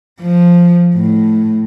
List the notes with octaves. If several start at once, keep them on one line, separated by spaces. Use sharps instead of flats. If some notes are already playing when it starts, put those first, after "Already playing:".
F3
A2